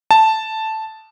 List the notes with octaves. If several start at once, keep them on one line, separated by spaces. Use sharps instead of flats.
A5